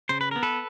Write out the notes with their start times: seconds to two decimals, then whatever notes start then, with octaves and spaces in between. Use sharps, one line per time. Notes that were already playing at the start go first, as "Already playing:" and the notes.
0.09 C#3 C5
0.21 B4
0.31 B3 A#4
0.43 A4 B4